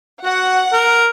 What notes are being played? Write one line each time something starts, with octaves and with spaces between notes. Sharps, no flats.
F#4 F#5
A#4